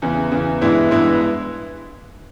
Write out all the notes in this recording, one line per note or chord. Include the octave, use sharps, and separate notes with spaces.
E2 C#3 E3
E2 C#3 E3
G2 E3 G#3 B3 E4
G2 E3 G#3 B3 E4